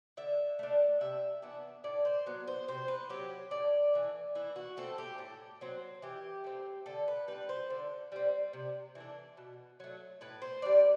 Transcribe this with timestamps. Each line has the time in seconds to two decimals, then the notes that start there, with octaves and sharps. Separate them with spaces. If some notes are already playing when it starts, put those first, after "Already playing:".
0.17 D3 E5
0.59 A3 D4
1.01 C3 E5
1.42 E3 B3 D4
1.84 A2 D5
2.05 C5
2.26 F#3 B3
2.48 C5
2.68 C3 C5
2.88 B4
3.09 F#3 C4 G4
3.51 A2 D5
3.94 E3 A3
4.35 E3 E4
4.56 F#4
4.77 A3 C4 A4
4.98 G4
5.19 A2
5.61 F#3 C4
6.02 E3 G4
6.44 A3 C4
6.86 D3 A4
7.08 B4
7.28 G3 C4 B4
7.49 C5
7.70 D3
8.12 G3 C4
8.53 C3
8.95 E3 A3 D4
9.37 B2
9.80 F#3 A3
10.21 A2 B4
10.42 C5
10.62 G3 D4 D5